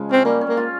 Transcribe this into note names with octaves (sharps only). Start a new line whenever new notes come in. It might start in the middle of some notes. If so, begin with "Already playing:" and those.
Already playing: C#3 F3 G#3
C4 C#4
G3 A#3
C#4
A#3
F4